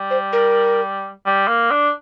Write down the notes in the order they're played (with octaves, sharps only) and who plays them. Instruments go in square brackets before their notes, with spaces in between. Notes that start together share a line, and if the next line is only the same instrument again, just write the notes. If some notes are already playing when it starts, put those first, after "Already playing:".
Already playing: [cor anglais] G3
[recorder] C5
A#4
[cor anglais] G3
A#3
D4